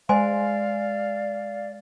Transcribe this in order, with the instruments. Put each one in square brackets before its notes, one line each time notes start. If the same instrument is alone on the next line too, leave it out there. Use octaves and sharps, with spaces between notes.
[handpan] G#3 [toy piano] C5 G#5 C6 [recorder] D5 [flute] F5